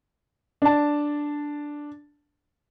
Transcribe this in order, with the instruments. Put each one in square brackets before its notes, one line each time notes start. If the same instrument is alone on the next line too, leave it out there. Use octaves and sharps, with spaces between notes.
[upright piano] D4 A5